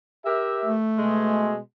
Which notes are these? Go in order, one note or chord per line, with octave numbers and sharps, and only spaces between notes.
G4 A#4 E5
A3
B2 G#3